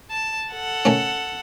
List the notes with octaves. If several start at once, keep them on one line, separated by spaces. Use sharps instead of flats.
A5
A4 F#5
D#3 A3 C#4